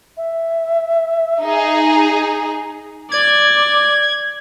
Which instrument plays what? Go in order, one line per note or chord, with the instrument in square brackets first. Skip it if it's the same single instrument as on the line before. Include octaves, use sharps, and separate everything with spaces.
[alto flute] E5
[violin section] D#4 G#4
[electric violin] D5 [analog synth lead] G#6